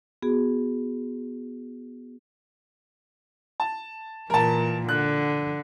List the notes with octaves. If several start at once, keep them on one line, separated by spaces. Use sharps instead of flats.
B3 F#4 G#4
A5
A#2 E3 A#4 A5
D3 F#6